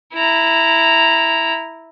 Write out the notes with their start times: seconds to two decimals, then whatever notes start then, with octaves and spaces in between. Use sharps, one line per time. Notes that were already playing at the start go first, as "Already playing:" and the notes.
0.14 E4 A#5